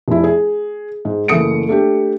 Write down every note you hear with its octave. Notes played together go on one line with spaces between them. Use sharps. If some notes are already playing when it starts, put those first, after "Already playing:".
F1 E4
G#4
G#2
F#1 E3 A3 D#6 C#7 D7
A3 D4 G4